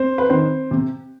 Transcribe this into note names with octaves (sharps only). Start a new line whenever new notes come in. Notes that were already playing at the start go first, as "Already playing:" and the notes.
Already playing: C4 C5
B4
D#3 C4 C5
C3